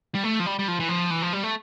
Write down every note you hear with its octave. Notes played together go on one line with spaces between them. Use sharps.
G3
A3
F3
G3
G3
F3
E3
F3
E3
F3
G3
A3